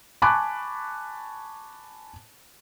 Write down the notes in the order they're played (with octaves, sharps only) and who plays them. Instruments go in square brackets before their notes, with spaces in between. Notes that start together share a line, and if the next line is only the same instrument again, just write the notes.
[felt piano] G#5 A5 B5 C#6 D6 F#6